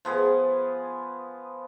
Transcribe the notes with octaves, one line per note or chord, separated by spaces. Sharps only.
F3 B3 G#4